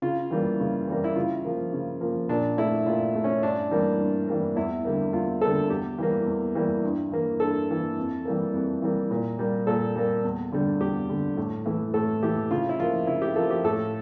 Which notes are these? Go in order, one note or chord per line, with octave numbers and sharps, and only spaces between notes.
C#3 F4
E3 G3 A#3
C#3
E3 G3 A#3
E4
C#3 F4
F3 A#3
C#3
F3 A#3
A#2 D4
A3 E4
A#2 F4
A3
C#4
G2 D4
E3 G3 A#3
G2
E3 G3 A#3
E2 E4
D3 G3 A#3
E2 F4
D3 G3 A#3 A4
E2 G4
E3 G3 A#3
E2
E3 G3 A#3
G2
E3 A#3
G2 A4
E3 A#3
F2
E3 G3 A#3
F2
E3 G3 A#3
A#2
G3 A#3
A#2 A4
G3 A#3
E2
D3 G3
E2 G4
D3 G3
A2
E3 A3
A2 A4
E3 A3 G4
C#3 F4
E4
F3 A#3 F4
C#3 E4
G4
F3 A#3 A4
G4
A2 A4